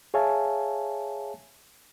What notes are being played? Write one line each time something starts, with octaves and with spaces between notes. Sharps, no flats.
G#4 C#5 E5 F5 G#5 A5